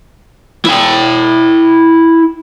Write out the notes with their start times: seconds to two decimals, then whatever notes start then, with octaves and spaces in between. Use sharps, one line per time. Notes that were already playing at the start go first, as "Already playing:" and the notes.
0.66 E4 G5